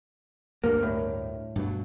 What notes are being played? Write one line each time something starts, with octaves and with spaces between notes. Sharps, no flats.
D2 G2 A#3
A2
G2 B2 F#3